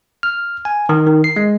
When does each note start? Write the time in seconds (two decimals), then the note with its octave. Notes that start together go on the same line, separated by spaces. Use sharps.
0.23 F6
0.65 G#5
0.89 D#3
1.07 D#3
1.24 C7
1.36 G#3